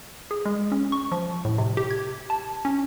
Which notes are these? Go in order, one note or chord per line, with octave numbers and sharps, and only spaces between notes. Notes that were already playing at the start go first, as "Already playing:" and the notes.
G#4
G#3
C#4
C#6
F3
A2
C3
G4
G#6
A5
C#4